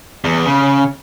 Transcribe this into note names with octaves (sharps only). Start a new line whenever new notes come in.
E2
C#3